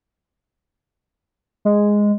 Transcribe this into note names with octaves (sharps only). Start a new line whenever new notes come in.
G#3